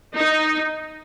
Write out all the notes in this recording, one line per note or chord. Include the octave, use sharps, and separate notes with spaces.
D#4